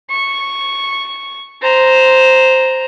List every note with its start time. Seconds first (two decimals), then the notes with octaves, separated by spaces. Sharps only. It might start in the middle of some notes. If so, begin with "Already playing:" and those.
0.10 C#6
1.62 C5 A#5